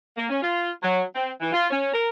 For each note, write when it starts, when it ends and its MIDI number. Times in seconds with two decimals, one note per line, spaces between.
0.16 0.25 58
0.30 0.41 61
0.42 0.69 65
0.82 1.02 54
1.13 1.30 60
1.40 1.52 52
1.52 1.66 65
1.70 1.90 61
1.93 2.09 70